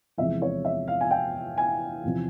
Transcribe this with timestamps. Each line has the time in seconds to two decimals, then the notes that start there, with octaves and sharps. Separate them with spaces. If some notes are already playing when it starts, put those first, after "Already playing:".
0.18 E2 C3 F3 G#3 E5
0.42 C#5
0.65 E5
0.88 F5
1.01 G#5
1.11 G5
1.58 G#5
2.03 E2 C3 F3